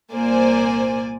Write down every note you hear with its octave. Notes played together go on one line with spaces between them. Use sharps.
C2 A#2 A#3 C5 D5 G#5